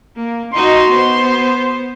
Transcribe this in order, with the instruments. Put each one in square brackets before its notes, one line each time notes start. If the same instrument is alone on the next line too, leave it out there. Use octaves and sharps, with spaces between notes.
[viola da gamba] A#3
[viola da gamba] D#4 F#4 D#5 [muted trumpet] C6
[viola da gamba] B3 C5